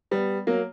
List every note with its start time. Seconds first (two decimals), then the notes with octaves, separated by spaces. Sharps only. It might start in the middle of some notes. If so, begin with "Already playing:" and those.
0.11 G3 B3
0.47 F#3 A#3